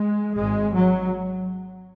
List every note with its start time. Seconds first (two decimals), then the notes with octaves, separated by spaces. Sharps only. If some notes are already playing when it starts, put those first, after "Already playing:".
Already playing: G#3
0.37 G#1 G#2 G#3
0.74 F#3